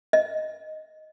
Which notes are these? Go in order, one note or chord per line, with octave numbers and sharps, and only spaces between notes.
D#5